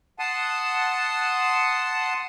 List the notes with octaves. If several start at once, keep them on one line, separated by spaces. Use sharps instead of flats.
F#5 A5 C6 D#6